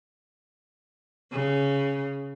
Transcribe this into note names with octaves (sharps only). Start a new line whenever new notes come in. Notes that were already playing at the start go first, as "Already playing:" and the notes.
C#3